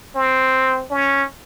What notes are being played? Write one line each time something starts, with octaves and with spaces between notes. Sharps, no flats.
C4
C#4